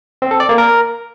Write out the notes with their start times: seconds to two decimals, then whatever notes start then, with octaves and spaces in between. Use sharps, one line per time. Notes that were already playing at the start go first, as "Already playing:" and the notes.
0.22 C4
0.31 A4
0.40 D5
0.49 A#3
0.58 A#4